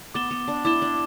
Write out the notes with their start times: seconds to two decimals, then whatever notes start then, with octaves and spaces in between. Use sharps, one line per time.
0.14 B3 D6 A6 E7 G7
0.31 B3
0.48 D4
0.65 E4 D6 A6 E7 G7
0.82 D4